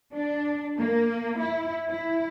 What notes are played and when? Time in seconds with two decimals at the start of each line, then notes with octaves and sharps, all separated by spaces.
0.13 D4
0.79 A#3
1.40 E4
1.89 E4